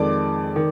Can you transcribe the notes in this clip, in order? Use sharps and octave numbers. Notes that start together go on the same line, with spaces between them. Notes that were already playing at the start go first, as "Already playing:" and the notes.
Already playing: F2 D#3 G#3 D5 D6
D#3